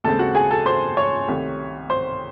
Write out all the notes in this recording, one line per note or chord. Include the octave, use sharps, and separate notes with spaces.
D#2 C#3 G#3 C4 A4 A5
F#4 F#5
G#4 G#5
A4 A5
C5 C6
C#5 C#6
C2 C3 D#3 A3
C5 C6